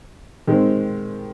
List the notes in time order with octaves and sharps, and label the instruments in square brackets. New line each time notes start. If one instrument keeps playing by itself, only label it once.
[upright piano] D#3 G#3 C4